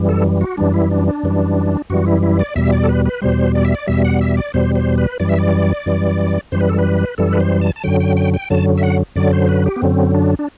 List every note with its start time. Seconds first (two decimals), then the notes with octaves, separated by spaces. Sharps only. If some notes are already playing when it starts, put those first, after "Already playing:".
Already playing: F#2 E3 G3
0.09 A4
0.41 F#4
0.57 F#2 E3 G3 D4
0.74 E4
0.91 D4
1.08 D4
1.23 F#2 E3 G3
1.90 F#2 E3 G3 F#4
2.06 E4
2.23 E4
2.39 D5
2.55 E2 B2 G3 E5
2.72 D5
2.84 A4
2.89 B4
3.06 B4
3.22 E2 B2 G3 C5
3.55 D5
3.65 E5
3.75 D5
3.87 E2 B2 G3 E5
4.04 F#5
4.21 E5
4.37 D5
4.54 E2 B2 G3 C5
4.75 C5
4.98 B4
5.20 F#2 E3 G3 D5
5.29 E5
5.39 D5
5.86 F#2 E3 G3
6.52 F#2 E3 G3 C5
6.61 B4
6.69 A4
6.79 B4
7.18 F#2 E3 G3 A4
7.33 B4
7.40 C5
7.61 A5
7.76 A5
7.84 F#2 D3 F#3 G5
8.00 G5
8.17 G5
8.34 G5
8.50 F#2 D3 F#3 A5
8.78 E5
8.83 F#5
9.16 F#2 D3 F#3 D5
9.33 C5
9.49 B4
9.66 G4
9.76 B3
9.82 F#2 D3 F#3 C4
10.15 D4
10.39 D4